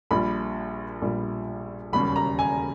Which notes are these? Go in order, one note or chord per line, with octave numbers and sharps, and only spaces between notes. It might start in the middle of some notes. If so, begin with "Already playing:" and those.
A#1 A#2 G3 B5
A#1 A#2 G3
E1 D#2 C#3 G3 B5
A#5
G#5